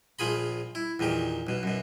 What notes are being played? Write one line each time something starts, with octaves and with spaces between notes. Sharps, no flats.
A#1 F3 F4 G#4 B5
E4
E2 A#2 D#3 G4
B1 B2
F#2 B2